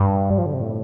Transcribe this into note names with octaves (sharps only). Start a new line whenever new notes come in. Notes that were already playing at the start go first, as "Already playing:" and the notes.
Already playing: G2
G3
F3
D3
C3
A2